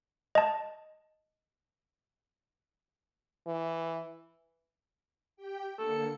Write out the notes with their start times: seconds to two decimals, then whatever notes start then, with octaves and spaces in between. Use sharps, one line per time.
0.35 D#5 A5
3.47 E3
5.36 G4 G5
5.78 D3 A#3 A4 C#7